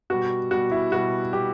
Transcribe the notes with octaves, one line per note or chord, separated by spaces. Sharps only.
B2 G3 F#4
B2 G3 F#4
E4
B2 G3 F#4
B2 G3 G4